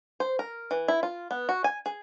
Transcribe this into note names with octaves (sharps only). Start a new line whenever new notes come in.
C5
A#4
E3
E4
F4
B3
F#4
G#5
G#4